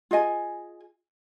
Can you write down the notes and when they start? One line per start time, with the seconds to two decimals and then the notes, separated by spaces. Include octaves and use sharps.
0.11 F4 G#4 D#5 G#5